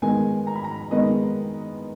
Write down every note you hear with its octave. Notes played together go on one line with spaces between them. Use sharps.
D#3 G#3 B3 G#5
A#5
B5
A#5
D#3 G#3 B3 D#5